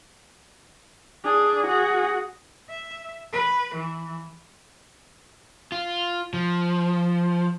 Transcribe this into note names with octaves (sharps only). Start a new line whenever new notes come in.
D4 G#4
F#4 G#4
E5
B4
E3
F4
F3